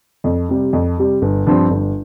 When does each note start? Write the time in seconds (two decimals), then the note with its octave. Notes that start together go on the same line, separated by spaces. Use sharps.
0.24 F2
0.49 C3 G3
0.73 F2
0.98 C3 G3
1.22 G1
1.46 G2 F3 C4
1.71 G1